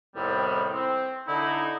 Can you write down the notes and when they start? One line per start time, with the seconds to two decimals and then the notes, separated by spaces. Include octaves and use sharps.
0.16 C2 A2 D#3 G3 B3 C4
0.73 C4
1.28 D3 D#4 E4